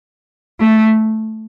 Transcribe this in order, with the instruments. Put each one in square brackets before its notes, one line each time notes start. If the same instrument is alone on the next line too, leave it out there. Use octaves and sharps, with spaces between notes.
[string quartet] A3